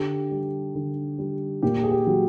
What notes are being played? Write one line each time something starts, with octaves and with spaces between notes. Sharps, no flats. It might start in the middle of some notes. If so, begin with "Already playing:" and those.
Already playing: D3 G4
G3
D3
G3
A#2 G4
G#4
G4
F#3